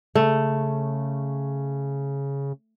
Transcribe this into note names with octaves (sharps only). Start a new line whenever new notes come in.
C#3 A3